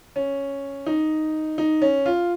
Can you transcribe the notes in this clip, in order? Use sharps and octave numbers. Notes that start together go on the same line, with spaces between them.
C#4
D#4
D#4
C#4
F4